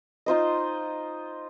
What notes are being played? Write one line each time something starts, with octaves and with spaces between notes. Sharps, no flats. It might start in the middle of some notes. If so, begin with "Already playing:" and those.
D#4 F4 C5 D#5